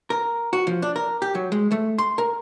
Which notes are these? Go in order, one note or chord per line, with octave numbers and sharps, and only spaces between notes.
A#4
F#4
F3
D4
A#4
G4
F#3
G#3
A3
C6
A#4